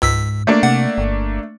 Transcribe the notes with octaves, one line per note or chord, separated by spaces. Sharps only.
C#2 G#2 E6 B6
A3 A#3 D4
C3 F#5
G1